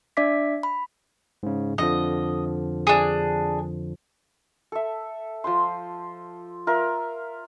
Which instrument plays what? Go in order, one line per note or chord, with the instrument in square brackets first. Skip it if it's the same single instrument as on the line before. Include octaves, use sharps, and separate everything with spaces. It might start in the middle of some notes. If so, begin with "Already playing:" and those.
[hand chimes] D4 D5 E5 D6 B6
B5
[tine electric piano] G#2 C#3
[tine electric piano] F2 D3 F3 [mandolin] D#5
[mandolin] D4 G#4
[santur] A4 E5
F3 C5 C6
F4 A#4 E5